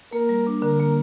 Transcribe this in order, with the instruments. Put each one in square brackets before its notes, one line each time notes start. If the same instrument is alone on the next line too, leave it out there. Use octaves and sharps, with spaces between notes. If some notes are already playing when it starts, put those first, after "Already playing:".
[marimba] A#3 [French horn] A#4
[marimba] G3
D4
[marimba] D3 [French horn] A#4
[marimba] A#3